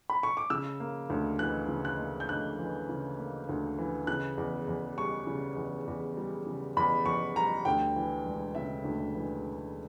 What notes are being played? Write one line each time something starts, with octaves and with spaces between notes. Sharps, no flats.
B5
C#6
D6
C#3 E6
A#3
D2
E3 F#6
C#3
F#6
A#3
G6
D2 F#6
E3
C#3
A#3
D2
E3
C#3 F#6
E2
E2
G3 C#6
C#3
E2
E2
G3
C#3
E2 B5
E2 C#6
G3 A#5
D2 G5
E3
E1
C#3 E5
D2
E3